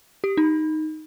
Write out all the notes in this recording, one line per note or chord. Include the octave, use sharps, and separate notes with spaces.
G4
D#4